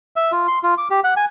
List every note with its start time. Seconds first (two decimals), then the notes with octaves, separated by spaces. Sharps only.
0.16 E5
0.32 F4
0.48 C6
0.63 F4
0.78 D6
0.90 G4
1.04 F#5
1.17 G#5